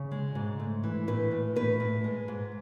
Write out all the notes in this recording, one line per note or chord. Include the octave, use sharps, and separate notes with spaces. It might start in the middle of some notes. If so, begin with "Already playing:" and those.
Already playing: C#3
G#3
G#2
A3
E3
A2 B4
A2
A2 B4
A2
G#3
G#2